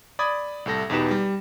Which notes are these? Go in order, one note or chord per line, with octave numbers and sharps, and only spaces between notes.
D5 B5 D#6 G#6
C2 A2 A4 A#6
E2 B2 D#4 G4 B4 E7
G3